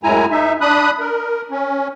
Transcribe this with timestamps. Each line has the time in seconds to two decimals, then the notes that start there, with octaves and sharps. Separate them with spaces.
0.03 F#2 A2 G#3 E4 G#5 A#5
0.31 D#4 E5
0.61 D4 B5 D#6 F#6
1.00 A#4
1.51 C#4